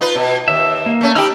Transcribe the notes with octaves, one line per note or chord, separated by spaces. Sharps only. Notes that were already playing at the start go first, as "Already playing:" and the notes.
D#4 F4 B4
B2
D#2 E5
A#3
A3 C#4
D#4 G4 B5 E6 F6